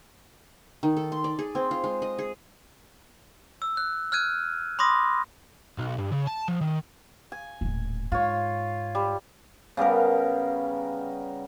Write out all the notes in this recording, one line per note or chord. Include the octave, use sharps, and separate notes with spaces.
D#3
A4
C6
D5
G#4
C4
F4
G#3
D#5
G#4
E6
F#6
F6 F#6 G#6 D#7
B5 C6 D6 D#6 A#6
B1
G2
C#3
A5
F3
D#3
G#5
D#1 A2
G#2 F4 C#5
G3
C#3 G3 B3 A#4